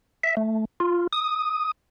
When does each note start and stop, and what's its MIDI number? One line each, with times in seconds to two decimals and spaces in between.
0.24 0.35 76
0.37 0.65 57
0.80 1.07 65
1.13 1.71 87